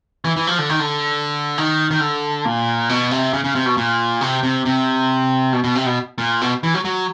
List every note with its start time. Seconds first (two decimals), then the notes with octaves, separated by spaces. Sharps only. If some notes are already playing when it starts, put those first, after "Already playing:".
0.25 E3
0.36 E3
0.47 F3
0.59 D3
0.69 D#3
0.80 D3
1.58 D#3
1.91 D#3
2.01 D3
2.45 A#2
2.89 B2
3.11 C3
3.34 C#3
3.44 C#3
3.55 C3
3.66 B2
3.77 A#2
4.21 C3
4.43 C3
4.65 C3
5.53 B2
5.64 B2
5.75 C3
5.86 B2
6.18 A#2
6.41 B2
6.63 E3
6.74 F#3
6.85 F#3